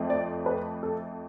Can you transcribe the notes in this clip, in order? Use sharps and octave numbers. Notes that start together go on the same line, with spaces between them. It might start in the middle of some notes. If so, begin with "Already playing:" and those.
Already playing: F2 F3 A3
D5
B4
A4